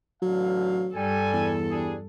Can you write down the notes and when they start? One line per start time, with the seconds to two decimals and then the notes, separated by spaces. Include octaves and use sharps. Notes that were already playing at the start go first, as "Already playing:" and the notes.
0.22 A1 D3 F#3 F5
0.95 G2 G3 A4 G#5
1.33 E2
1.69 G3 D4 G#4